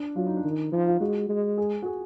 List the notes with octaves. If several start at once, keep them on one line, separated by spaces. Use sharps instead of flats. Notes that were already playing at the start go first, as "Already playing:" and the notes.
Already playing: D4
F#3 F4
D#4
D4
D#3 D#4
F3 D#4
F4
G#3 F#4
G#3
G#4
F#4
G#4